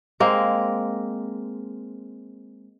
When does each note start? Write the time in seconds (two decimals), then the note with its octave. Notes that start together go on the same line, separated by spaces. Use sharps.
0.20 G#3 A#3 C4